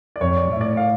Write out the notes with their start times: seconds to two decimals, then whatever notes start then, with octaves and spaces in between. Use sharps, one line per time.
0.16 D5
0.21 F2 C#5
0.37 D5
0.53 A2 E5
0.61 D5
0.77 F5